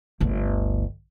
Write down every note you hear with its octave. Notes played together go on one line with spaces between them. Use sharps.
G1 D2